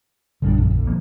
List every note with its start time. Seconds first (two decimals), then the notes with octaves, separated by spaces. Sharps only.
0.42 A#1 F#2 C#3 G3 D4
0.58 G1 C2 F2
0.71 D2
0.87 B2 F3 A#3